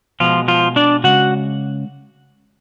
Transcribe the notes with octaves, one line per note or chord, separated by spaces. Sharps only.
B2 F3 G#3 F4
F3 F4
D4 D5
C#3 G#3 F#4 F#5